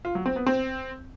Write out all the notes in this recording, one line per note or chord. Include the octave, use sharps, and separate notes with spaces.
F4
F#3
C4
B3
C4